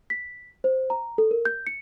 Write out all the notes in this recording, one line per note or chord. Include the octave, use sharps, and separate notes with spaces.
B6
C5
A#5
A4
A#4
G6
C#7